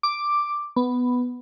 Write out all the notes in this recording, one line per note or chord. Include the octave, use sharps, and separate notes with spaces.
D6
B3